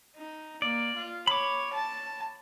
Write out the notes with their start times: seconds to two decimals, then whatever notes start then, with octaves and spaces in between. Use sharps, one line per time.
0.16 D#4
0.62 A#3 D5
0.95 F4
1.27 C#5 B5 D6
1.73 A5